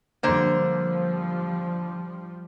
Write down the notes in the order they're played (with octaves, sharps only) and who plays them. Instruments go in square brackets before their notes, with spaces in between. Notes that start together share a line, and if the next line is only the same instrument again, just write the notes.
[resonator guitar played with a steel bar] D3 A#3 C5 [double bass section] F3 G3